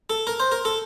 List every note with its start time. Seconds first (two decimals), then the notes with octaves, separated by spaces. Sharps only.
0.10 A4
0.27 A#4
0.40 C5
0.52 A#4
0.65 A4